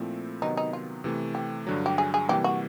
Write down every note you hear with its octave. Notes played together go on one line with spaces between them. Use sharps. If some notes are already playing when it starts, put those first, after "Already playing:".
Already playing: A#2 F3 A3 C4 E4
C3 D#3 F#3 B3 D#4
D#4
F4
C3 E3 A3
G4
G2 D3 F#3
G4
G#4
G#4
C3 E3 G3 A#3 G4
F#4